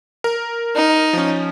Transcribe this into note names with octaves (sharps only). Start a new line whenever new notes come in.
A#4
D#4
F3 C#4